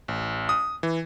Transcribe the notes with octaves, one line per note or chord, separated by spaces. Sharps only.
A1
D#6
E3